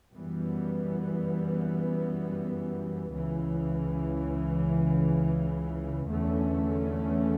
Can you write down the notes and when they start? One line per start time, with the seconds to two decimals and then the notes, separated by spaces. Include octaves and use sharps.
0.15 F#2 E3 G3 B3
3.11 C#2 C#3 E3
6.06 E2 D3 A3 C#4